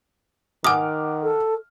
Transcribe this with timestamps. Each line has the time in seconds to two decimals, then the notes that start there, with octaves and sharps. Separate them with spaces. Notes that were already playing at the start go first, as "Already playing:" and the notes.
0.64 D#3 F#5 G#5 D6 D#6 F6
1.23 A4